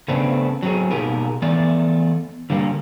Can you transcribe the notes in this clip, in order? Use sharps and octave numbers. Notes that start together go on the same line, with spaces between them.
C#3 A3 B3 C4 D4
F#3 C4 G#4
B2 A#3 D#4 G4 G#4 A#4
E3 A3 B3 D5
D3 G3 A#3